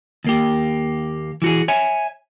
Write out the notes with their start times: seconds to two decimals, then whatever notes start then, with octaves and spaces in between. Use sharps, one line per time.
0.24 D#2 A#3 G4
1.42 E3 F#4 G#4
1.68 C#5 E5 G#5